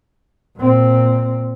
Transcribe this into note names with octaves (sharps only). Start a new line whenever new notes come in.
A#2 C4